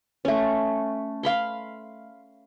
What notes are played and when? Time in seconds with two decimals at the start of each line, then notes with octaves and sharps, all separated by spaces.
0.25 A3 C#4
1.23 F5 B5 C6